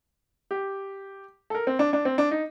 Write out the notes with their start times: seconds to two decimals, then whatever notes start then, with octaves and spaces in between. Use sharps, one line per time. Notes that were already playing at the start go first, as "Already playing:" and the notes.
0.51 G4
1.50 A4
1.55 A#4
1.67 C4
1.79 D4
1.93 D4
2.05 C4
2.18 D4
2.31 D#4